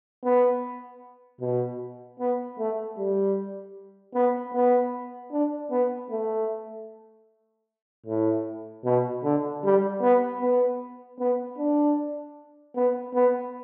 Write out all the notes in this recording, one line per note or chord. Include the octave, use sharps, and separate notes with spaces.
B3
B2
B3
A3
G3
B3
B3
D4
B3
A3
A2
B2
D3
G3
B3
B3
B3
D4
B3
B3